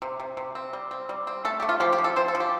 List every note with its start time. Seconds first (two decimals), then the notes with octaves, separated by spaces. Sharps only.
0.02 C3
0.19 C3
0.37 C3
0.55 C4
0.73 G3
0.91 C4
1.09 G3
1.27 C4
1.45 A3 A4
1.60 A3 G4
1.69 F4
1.80 F3 G4
1.93 G4
1.98 F3
2.04 A4
2.16 C4 C5
2.28 A4
2.35 F3
2.40 G4